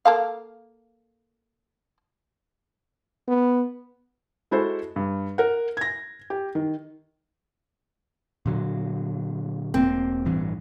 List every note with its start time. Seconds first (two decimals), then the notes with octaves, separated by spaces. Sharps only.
0.05 A#3 A4 F5
3.28 B3
4.51 G#3 E4 F#4 A4 C5
4.96 G2
5.38 A#4 F#5
5.77 G#6 A#6
6.30 G4
6.55 D#3
8.46 A#2 D3 F#3
9.74 E1 A#3 C4
10.25 A1 G2 E3